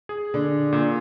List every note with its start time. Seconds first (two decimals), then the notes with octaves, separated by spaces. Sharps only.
0.09 G#4
0.34 D3
0.72 A#2